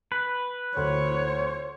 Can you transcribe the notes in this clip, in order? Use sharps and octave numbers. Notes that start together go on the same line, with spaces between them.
B4
D2 C5 C#5